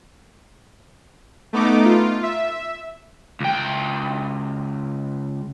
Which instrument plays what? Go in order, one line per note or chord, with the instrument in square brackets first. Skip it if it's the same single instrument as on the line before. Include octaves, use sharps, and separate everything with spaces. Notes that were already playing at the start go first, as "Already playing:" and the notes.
[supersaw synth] A3 B3 D#4 D6
F4
E5
[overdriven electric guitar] C#2 G5